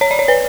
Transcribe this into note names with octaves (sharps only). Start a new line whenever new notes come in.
C#5
D5
C#5
B4